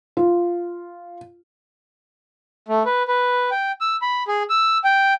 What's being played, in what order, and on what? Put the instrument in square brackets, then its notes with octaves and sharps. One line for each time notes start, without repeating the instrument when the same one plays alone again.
[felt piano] F4
[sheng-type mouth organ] A3
B4
B4
G5
E6
B5
G#4
E6
G5